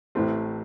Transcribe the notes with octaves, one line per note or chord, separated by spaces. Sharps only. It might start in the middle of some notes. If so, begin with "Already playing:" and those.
A1 A2 E3 A3 C4